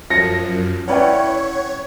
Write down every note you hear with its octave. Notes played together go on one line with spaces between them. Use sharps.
F#2 F3 A#6 C#7
C#4 E4 B4 C#5 D5 F#5 G5